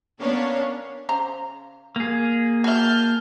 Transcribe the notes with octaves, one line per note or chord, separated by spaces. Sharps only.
B3 C#4 D4 A#4 C#5 F5
C#3 C5 A#5
A#3 G#4
F#4 E5 A5 F6 G6